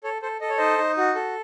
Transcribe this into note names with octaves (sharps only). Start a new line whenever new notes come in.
A4 C#5
A4 C5
A4 D#5
C#5
D#4 C5 D#5
D#4
F#4
A4